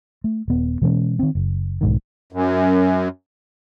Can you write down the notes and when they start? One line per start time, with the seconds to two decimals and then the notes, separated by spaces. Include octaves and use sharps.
0.24 A3
0.48 D#1 B3
0.82 B2 E3 G#3 C#4
1.19 D#3 C4
1.35 F#1
1.81 B1 G#2 D#3
2.33 F#2